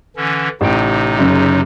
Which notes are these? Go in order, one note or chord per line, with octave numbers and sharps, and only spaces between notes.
D3 E3 C#4
A1 C3 D#4 G5 D7
F#1 C#3